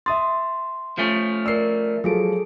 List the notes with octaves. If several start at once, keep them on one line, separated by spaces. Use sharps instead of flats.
E5 C6 D#6 A6
F3 A3 C#4
A#4 D5 E6 C7
F3 F#3 G#4 A4 D7